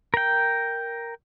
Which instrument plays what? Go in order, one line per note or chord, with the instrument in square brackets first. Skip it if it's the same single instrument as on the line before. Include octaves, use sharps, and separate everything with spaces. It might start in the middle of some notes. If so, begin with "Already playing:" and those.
[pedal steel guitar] A#4 G5